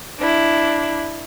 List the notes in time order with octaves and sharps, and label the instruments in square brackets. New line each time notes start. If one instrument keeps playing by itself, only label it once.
[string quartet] D4 E4